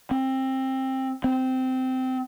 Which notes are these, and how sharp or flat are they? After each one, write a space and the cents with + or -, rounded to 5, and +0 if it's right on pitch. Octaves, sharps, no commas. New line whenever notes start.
C4 +20
C4 -15